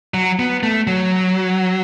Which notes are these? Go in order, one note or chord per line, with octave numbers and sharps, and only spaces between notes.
F#3
B3
A3
F#3